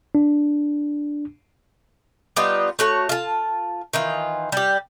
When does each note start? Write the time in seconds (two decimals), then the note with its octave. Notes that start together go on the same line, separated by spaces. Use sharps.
0.15 D4
2.36 G3 B3 D#4 F4
2.79 A3 F#4 C#5
3.09 F4 A5
3.93 D#3 E3 F4
4.52 G3 G4